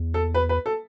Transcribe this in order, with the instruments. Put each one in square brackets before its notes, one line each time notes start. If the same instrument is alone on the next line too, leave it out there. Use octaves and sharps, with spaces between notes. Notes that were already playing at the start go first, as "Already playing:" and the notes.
Already playing: [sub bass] E2
[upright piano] A4
B4
B4
A4